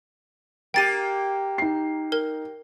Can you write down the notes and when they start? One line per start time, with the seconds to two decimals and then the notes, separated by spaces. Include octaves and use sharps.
0.74 A#3 G4 G5 A6 D#7
1.58 D#4 C7
2.12 A#4